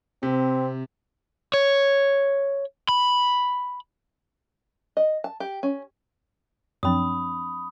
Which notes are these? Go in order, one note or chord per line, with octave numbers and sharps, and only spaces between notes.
C3 C4
C#5
B5
D#5
A5
G4
C#4
F#2 F3 C4 D4 B5 D#6